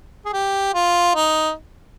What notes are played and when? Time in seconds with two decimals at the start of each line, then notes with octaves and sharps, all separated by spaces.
0.26 G#4
0.33 G4
0.74 F4
1.15 D#4